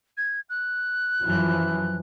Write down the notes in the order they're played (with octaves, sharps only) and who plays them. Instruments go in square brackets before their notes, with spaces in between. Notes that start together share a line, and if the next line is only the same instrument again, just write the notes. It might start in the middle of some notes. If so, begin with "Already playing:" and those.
[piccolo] G#6
F#6
[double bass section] F#2 E3 F3